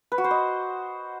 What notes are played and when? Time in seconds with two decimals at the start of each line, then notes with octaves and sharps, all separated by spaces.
0.12 B4
0.18 F#4
0.24 C5
0.31 D#5